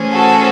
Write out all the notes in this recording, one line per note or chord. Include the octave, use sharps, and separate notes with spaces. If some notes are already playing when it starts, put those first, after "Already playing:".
Already playing: E3 A3 C#4 G#4 C5
F#4 A4